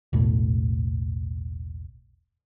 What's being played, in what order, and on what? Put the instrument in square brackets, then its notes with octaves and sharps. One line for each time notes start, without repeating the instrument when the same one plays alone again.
[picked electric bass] E1 B1 A2